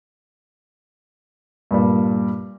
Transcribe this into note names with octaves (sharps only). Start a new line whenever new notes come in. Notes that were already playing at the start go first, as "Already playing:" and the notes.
G2 A#2 G3